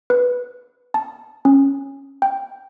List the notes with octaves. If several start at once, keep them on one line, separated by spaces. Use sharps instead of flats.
B4
A5
C#4
G5